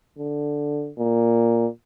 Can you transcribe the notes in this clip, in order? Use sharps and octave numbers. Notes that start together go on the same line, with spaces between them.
D3
A#2